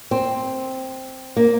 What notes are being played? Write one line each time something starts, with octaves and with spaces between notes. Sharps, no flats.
C4
A#3